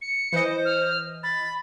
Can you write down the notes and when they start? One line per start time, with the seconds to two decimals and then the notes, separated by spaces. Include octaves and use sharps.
0.02 C#7
0.33 E3 C5 D#5
0.65 F6
1.23 B5 A6